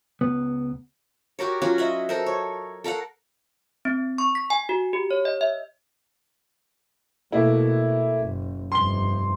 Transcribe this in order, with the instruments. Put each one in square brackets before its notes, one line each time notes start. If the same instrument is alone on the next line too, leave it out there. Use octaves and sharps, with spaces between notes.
[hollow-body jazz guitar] C#2 B3
[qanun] F#4 G4 A#4 C#5
F#3 C#4 F4 F#4
D#5 E5 F#5
A4 A#4 C5
C#5
A4 A#4 F5 F#5
[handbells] C4
C#6
B6
G#5
F#4
G4
C#5
D#5
E5
[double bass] B2 [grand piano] A3 A#3 E4
[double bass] F#1
[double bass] F1 G2 [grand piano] C6 G7